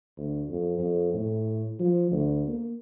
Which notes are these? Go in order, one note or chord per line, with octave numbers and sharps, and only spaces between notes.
D2
F2
F2
A2
F3
D2
A#3